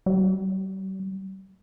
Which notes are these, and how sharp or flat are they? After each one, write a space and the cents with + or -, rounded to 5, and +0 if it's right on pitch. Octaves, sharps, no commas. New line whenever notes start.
G3 -40